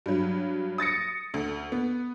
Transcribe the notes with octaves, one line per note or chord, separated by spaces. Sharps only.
G2 F#3
D#6 A6 A#6 C#7
D2
B3